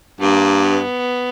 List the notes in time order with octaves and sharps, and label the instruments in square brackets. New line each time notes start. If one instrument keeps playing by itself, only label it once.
[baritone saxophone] G2 [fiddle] A#3
[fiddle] B3